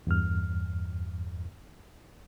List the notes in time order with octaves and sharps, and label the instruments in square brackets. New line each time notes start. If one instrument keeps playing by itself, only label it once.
[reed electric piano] E2 G2 F6